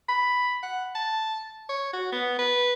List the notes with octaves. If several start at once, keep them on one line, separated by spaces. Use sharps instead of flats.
B5
F#5
A5
C#5
F#4
B3
B4